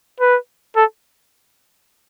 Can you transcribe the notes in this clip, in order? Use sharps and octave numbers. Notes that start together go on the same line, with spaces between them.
B4
A4